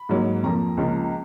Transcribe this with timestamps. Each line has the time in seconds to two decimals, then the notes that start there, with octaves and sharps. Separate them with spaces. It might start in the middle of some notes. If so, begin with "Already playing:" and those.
Already playing: B5
0.09 G#2 F#3 A#3
0.43 F2 F3 A#3 A#5
0.77 C#2 C#3 F3 A#3